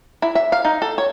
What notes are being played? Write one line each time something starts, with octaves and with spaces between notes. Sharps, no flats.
E4
E5
F5
D#4
A4
C#5